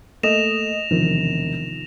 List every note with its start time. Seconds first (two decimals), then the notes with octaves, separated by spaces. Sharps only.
0.23 A3 A#3 D#5 A#6 E7 F7
0.91 E1 C3 D#3 F3